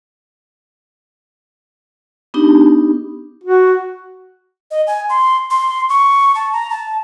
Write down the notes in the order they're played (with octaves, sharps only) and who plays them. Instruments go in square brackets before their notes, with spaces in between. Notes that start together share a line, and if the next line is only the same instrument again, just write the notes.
[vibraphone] B3 D4 D#4 G4
[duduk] F#4
[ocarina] D#5
G#5
C6
C6
C#6
A5
A#5
A5